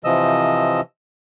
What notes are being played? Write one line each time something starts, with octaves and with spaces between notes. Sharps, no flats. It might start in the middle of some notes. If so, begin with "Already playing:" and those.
C3 E3 F3 D#5 E6